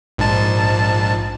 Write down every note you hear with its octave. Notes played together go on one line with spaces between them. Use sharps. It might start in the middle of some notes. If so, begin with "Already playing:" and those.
A#1 G#2 A5